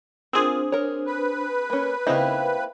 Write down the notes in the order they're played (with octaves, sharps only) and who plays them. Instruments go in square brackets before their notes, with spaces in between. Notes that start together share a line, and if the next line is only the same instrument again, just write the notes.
[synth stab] C4 G#4 [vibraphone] D4 C5 [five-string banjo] F4 A#4
[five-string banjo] A#4 C#5
[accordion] B4
[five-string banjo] A#3 C#4
[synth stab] C#3 D#4 [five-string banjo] A#3 C4 E4 [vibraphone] C5 F5 G5